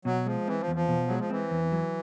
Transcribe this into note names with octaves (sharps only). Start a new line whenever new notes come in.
B2 F#3
F3 G#3
E3 C4
F3
E2
F3
B2
F#3 G#3
F3
E3 C4
E2
F#3